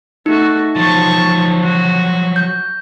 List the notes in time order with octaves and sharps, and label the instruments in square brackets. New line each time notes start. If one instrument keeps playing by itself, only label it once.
[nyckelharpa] A3 F#4 [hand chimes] D#4
[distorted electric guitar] F3 F#3 [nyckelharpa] A5 C#6
[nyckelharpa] F#4
[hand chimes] G6